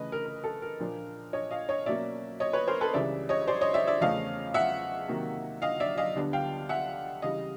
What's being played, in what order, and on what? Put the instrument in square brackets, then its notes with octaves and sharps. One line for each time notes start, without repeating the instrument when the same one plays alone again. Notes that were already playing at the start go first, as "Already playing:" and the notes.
Already playing: [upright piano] C#3 E3 A3 B4 D#5
A#4
A#4
A4
A#4
A#2 F3 A#3 D4
C#5 D#5
D#5 F5
C#5 D#5
B2 F#3 A#3 C#4 D5 E5
C#5 D#5
B4 C#5
A#4 C5
A4 B4
C#2 C#3 E3 G3 D5 E5
C#5 D#5
C5 D5
C#5 D#5
D5 E5
D5 E5
E2 C#3 F3 A3 C#4 D#5 F5
E5 F#5
C3 D#3 F#3 A#3
D#5 F5
D5 E5
D#5 F5
D2 D3 G3 B3 D4
F5 G5
E5 F#5
C#3 E3 G3 D#5 F5